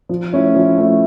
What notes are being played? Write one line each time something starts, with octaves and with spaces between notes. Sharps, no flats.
F3
A3 C#4 E4
F3
A3 C#4 E4